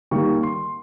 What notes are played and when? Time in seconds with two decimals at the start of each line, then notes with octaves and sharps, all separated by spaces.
0.11 D#3 G3 A#3 C#6
0.43 C6